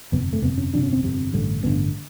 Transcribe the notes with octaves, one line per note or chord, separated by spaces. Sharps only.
G1 F2 C3 B3
A3
G1 F2 C3 B3
C#4
G1 F2 C3 D4
C#4
C4
G1 F2 C3
A1 G2 D3
A1 G2 D3 B3